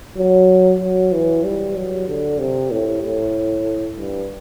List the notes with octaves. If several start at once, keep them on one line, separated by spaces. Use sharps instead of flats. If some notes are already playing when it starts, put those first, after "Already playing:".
F#3
F#3
E3
G3
F#3
D3
C3
A2
A2
G2